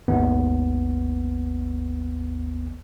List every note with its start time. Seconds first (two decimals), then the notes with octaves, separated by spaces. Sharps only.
0.08 G#1 D#2 B3